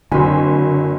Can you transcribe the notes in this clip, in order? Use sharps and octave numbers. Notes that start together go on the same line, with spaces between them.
F#1 D3 C4 F#4 G#5 B5 C6